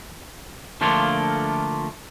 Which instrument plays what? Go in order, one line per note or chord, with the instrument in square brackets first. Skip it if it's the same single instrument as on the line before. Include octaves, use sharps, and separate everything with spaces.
[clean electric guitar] D3 F3 A3 A#3 D4 F4